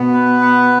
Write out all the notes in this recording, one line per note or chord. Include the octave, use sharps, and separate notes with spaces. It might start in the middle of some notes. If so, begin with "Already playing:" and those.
Already playing: B2 B3
B4
B3